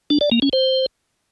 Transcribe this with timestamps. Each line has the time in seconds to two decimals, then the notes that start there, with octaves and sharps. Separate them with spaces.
0.10 D4
0.21 D5
0.32 A#3
0.42 C#4
0.53 C5